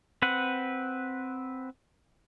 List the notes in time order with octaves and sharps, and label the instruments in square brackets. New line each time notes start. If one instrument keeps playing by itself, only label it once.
[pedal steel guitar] C4 B4 F#5